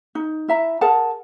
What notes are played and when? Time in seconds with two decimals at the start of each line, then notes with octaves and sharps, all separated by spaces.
0.15 D#4
0.48 E4 E5 A#5
0.81 G#4 A#4 F#5 A5